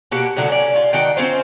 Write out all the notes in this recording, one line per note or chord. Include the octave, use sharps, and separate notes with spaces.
B2 A#3 F#4 G4
A2 D3 F#3 F#5
C#4 D5
F4
D#3 D4 F#4 G5
C4 C#4 F4 C5